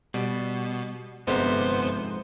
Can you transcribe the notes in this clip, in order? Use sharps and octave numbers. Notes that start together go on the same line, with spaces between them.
B2 G3
G1 F2 G#2 C3 B3 C5